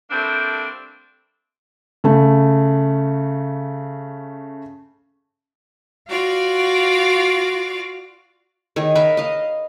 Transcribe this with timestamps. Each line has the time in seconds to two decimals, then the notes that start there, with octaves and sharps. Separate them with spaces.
0.11 G3 A3 A#3 C4 D4
2.04 C#3 A3
6.08 F4 F#4 D5 F5
8.76 D#3 G#4 C#5
8.95 A#4 B4 E5 F5
9.17 D#5 F5